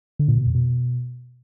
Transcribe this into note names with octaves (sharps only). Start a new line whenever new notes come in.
D3
A#2
B2
F2
B2